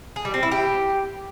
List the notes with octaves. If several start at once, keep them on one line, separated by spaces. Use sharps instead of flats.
G#4
G3
C4
E4
G4